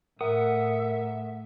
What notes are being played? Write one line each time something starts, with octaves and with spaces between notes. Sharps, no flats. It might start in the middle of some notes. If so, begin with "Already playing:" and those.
A2 A#4 E5 F#5 D#6